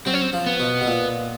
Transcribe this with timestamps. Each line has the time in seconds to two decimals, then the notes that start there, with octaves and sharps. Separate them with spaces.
0.06 F#3 C4
0.14 C#4
0.22 C4
0.33 F3
0.46 B3
0.60 B2
0.81 B2
0.87 A#2